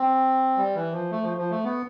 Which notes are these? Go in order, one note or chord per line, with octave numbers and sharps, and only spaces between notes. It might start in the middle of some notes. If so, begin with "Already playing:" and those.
Already playing: C4
G3
E3
F3
A3
F3
F3
A3
B3